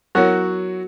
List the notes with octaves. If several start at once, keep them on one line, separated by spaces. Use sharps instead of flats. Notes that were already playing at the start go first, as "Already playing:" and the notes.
F#3 B3 E4 F#4 A#4 C#5